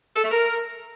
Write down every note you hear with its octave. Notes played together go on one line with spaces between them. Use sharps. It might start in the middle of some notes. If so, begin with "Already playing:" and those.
A4
A3
A#4